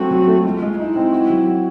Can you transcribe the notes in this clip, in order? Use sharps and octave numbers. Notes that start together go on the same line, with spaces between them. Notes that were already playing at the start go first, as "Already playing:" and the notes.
Already playing: F#3 A3 C4 F#4
F#3
A3
G#3 F4
G#3
D#4 E4
C4
F#4
F#3
F#4